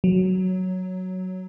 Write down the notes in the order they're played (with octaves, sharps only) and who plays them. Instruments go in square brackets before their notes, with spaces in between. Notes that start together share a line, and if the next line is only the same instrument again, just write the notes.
[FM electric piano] F#3